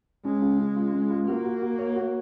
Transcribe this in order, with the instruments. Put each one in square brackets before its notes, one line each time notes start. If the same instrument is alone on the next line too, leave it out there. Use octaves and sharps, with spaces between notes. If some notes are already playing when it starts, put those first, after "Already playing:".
[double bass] G#3 [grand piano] C#4
[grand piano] C#3
C#3
F4
C#3
F4
[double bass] A#3 [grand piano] F#4
[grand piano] F#4
F#4
C#5
F#4